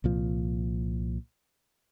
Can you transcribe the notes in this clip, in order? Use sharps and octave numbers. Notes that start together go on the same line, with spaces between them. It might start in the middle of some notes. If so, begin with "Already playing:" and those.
C2 A#2 F3